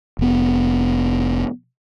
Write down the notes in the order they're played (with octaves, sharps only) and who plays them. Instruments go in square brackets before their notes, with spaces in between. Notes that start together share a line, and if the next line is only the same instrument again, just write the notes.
[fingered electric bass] F1 B3